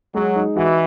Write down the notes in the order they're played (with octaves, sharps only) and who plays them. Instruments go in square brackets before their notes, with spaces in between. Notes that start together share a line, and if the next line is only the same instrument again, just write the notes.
[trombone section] F#3 [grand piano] G#3
[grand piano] D#4
[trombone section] E3 [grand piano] F#4